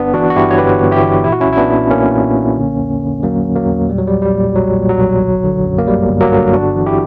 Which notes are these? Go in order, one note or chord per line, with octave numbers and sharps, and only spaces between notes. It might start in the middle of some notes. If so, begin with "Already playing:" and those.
Already playing: G1 B3 D4
E3 D4 F#4
F#4
G2 E4 G4
C#5
G1 G4 B4
G1
E4 G4
E3
A#2 E4
F#4
C#4 E4
B1
E4
B3 D4
A#2
B1 A#3 C#4
A#2
B1
D3
E2
D3
E2 F#3 A#3
D3
F#3 A#3
E2
A#2 G3
F#3
B1 G3
G3
A#2
B1 F#3
A#2
F#3
B1
G1
D3
F#2
A#3
G1 G3
G1
F#3 A#3
D3
G1 D4 F#4
E3
E4 G4